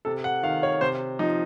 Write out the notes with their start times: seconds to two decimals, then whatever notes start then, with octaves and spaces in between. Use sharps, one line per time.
0.05 C3 A4
0.24 F#5
0.43 D#3 F5
0.63 C#5
0.81 C3 C5
1.19 F3 D#4